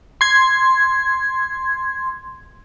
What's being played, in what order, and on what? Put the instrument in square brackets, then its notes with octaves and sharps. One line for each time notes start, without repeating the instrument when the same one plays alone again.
[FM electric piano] C6 G#6